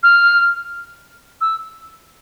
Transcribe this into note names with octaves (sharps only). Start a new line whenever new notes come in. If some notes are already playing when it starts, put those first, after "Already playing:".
F6
E6